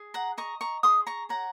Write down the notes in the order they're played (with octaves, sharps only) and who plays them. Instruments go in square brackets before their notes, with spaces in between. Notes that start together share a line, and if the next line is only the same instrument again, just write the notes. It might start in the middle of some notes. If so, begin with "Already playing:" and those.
Already playing: [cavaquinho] G#4
F#5 A#5
D#5 A#5 C#6
A#5 C#6
G#4 C6 D#6
A#5 C#6
C#5 F#5 A#5